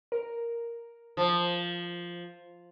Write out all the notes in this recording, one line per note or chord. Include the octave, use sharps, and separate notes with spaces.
A#4
F3